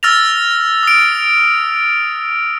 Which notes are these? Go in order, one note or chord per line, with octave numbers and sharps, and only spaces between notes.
E6 F6 A6 A#6 F7
D#6 D7